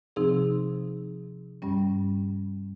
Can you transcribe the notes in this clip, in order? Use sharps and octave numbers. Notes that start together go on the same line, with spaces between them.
C3 F3 C4 D#4 G#4
G2 G3 C#4